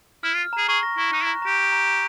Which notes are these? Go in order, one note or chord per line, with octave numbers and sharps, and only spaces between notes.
E4 F6
F4
F6
G#4 A#5
G#4 C#6
A#6
E4 C#6
D#4 F#6
E4
A#5
G4 A#5
A#5
A#5
A#5